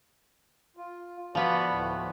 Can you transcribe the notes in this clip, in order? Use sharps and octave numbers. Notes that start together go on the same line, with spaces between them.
F4
F3 B3 F#4 B4 D5
D2 A2